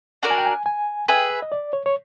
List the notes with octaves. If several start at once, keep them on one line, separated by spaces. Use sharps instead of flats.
D4 F#4 A#4 D5
G#5
G5
G#5
G#5
G#4 B4 E5 G5
D#5
D5
C#5
C#5